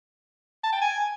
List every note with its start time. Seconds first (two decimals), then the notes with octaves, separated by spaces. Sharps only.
0.63 A5
0.72 G5
0.81 G#5